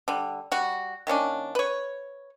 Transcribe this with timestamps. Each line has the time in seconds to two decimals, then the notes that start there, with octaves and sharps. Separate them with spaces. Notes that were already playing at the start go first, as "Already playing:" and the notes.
0.08 D3 G3
0.52 G3 F#4
1.07 D#3 A#3 C#4 D4
1.55 B4 C#5